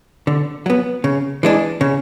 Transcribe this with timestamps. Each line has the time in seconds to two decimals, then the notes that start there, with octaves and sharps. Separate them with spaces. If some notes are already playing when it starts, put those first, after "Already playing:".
0.27 D3
0.66 F#3 B3
1.04 C#3
1.43 E3 G#3 D4
1.81 C#3